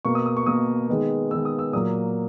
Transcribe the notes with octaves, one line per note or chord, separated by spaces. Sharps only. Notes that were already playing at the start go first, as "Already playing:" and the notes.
B2 A#3 C#6
D#6
D#6
C#6
B2 A#3 D#6
D#3 G#3 B3
D#3 G#3 B3 E6
D#6
E6
A#2 F#3 A#3 D#6